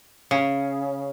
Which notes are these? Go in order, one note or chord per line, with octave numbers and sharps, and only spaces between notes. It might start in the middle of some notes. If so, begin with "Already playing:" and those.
C#3